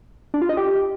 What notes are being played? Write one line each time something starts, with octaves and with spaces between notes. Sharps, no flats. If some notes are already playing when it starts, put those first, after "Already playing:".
D4
F4
D#5
G4